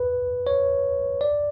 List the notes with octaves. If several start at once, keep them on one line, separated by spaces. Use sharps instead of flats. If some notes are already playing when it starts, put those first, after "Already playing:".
Already playing: B4
C#5
D5